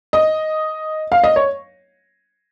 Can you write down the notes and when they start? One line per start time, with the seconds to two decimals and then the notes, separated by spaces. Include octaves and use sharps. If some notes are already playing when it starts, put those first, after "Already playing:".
0.13 D#5
1.12 F5
1.24 D#5
1.36 C#5